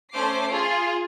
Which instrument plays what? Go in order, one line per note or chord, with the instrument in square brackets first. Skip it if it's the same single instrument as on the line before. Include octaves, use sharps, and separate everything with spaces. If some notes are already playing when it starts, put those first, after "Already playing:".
[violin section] A3 C#4 C5 D6 C7
F4 G#4